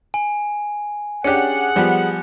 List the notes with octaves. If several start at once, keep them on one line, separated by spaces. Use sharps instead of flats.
G#5
C#4 D4 G4 G#4 F#5 F#6 C#7
F3 G3 B3